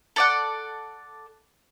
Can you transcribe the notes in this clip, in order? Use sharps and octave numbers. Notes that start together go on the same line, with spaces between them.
A4 D5 F#5